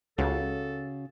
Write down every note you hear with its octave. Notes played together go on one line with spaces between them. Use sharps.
C#2 C#3 C#4 F#4 A4